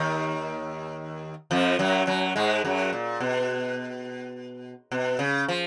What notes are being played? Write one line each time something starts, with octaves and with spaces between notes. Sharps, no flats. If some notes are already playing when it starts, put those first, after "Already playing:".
Already playing: D#2 D#3
F2 F3
F#2 F#3
F#2 F#3
G#2 G#3
F#2 F#3
A#2
B2
B2
C#3
F3